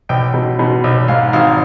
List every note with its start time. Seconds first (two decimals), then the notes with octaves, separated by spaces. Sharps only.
0.09 B1 G5
0.34 B2
0.59 B2
0.84 B1
1.08 G#2 F5
1.33 G#1 F5